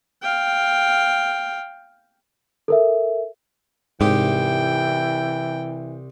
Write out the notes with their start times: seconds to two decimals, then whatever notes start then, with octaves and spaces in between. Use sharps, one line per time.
0.23 F5 G5
2.68 A4 A#4 E5
4.01 C2 G#2 E3 G4 G5